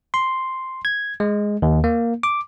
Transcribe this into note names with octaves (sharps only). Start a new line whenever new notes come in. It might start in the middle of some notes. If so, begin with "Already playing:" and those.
C6
G#6
G#3
D#2
A#3
D6